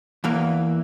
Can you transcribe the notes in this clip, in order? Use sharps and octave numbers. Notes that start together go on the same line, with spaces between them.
E2 E3 A#3